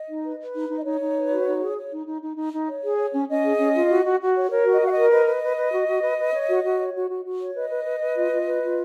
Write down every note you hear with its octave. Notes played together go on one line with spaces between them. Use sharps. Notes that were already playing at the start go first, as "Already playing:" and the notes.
Already playing: D#5
D#4
B4
B4
D#4
D#4
D#5
D#4 C#5
D#4
B4
F#4
D#4
G#4
C#5
D#4
D#4
D#4
D#4
D#4
C#5
G#4
C#5
C#4
C#4 D#5
G#4
C#4
F4
F#4
F#4
F#4
C#5
A#4 C#5
F#4
D#5
F#4 F5
D#5
A#4
B4 D#5
B4
B4
B4
F#4
F#4
B4
B4
C#5
F#4
F#4
C#5
F#4
F#4
F#4
C#5
B4 D#5
B4
B4
B4
F4
F4
B4
F4